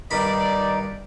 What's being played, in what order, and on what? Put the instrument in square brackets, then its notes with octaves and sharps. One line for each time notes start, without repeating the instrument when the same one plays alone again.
[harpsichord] G2 D#3 B5 [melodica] D#4 [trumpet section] D5